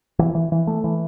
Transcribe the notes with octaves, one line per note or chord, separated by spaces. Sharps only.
E3
E3
E3
A3
E3